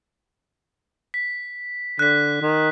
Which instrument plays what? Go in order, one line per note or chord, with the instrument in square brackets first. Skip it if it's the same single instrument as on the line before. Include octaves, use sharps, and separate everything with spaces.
[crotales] B6
[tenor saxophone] D3 [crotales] F#6 B6
[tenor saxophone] D#3